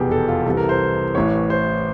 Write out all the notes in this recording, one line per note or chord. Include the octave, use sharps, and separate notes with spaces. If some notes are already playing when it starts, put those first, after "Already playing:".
Already playing: F1 E2 B2 G4 G#4
A4
F4
C2 C3 E3 A4
A#4
C5
A1 A2 E3 C#5
C5